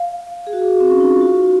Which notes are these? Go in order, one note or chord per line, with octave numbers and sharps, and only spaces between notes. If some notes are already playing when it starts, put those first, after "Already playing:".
Already playing: F5
G#4
F#4
G#4
C4
C#4
D#4
F4
F#4